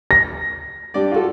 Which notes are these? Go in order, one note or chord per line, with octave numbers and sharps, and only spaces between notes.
A#6
G2 G4 D5
F4 F#4 A4